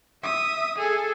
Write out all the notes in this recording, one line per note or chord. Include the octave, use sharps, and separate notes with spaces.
E5 D#6
G#4 A4